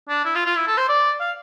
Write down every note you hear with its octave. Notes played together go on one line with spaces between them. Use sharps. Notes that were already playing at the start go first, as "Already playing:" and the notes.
D4
E4
F4
F4
E4
A4
C5
D5
F5